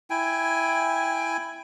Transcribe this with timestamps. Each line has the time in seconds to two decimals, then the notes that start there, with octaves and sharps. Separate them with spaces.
0.10 E4 G5 G#5